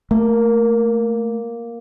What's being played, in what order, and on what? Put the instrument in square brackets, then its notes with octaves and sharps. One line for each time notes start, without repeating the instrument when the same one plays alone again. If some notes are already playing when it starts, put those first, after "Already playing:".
[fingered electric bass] A3 [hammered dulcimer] A#3